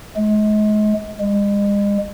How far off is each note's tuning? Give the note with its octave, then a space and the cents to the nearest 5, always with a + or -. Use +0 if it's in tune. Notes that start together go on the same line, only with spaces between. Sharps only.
G#3 +35
G#3 -40